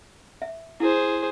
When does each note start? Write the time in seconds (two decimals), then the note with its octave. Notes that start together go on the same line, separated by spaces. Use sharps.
0.42 E5
0.80 E4 G#4 C5